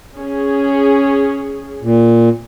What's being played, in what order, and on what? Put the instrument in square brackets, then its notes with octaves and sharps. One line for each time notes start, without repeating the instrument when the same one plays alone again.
[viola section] C#4 G#4
[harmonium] A#2